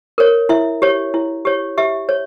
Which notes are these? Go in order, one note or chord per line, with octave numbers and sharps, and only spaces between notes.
A#4 C#5
E4 E5
G4 C#5
E4
G4 C#5
G4 E5
C#5